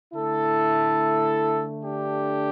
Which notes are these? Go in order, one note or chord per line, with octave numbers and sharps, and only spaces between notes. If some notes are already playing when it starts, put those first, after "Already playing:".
D3 A3 E4 A4
D4 G4